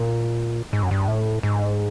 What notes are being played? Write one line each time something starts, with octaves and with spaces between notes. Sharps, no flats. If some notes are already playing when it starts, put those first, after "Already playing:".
Already playing: A#2
G#2
F#2
G2
A2
G#2